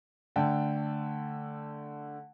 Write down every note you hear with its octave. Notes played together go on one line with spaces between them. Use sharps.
D3 A3 G5 A5